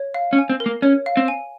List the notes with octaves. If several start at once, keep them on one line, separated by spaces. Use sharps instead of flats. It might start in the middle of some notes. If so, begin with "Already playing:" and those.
Already playing: C#5
F5
C#4
G#5
C4
A#4
A#3
C#4 C#5
F5
C4
G#5